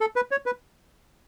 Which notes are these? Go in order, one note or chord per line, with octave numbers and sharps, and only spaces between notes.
A4
B4
C#5
B4